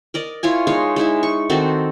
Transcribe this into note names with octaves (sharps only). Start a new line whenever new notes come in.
A#4 D5 D#5
E4 F4 C#5 G#5
G#3 D#4 C#5 F5
G#3 D#4 E4 E5
C#6
D#3 C4 F#4 A4